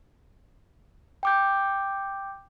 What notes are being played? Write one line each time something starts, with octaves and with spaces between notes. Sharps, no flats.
G5 D6 G6